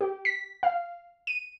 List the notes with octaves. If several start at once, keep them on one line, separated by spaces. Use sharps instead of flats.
G4
B6
F5
D#7